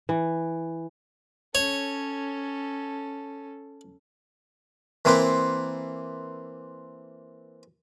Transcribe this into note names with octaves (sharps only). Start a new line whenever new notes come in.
E3
C#4 A4 C#5
E3 A#3 C4 B4 C5